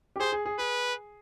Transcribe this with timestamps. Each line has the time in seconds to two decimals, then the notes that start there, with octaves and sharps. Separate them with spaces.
0.16 G4
0.20 G#4 C5
0.32 G#4
0.46 G#4
0.59 G#4 B4